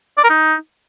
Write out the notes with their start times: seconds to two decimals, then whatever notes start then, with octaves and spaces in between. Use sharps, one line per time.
0.18 D5
0.24 A#4
0.30 D#4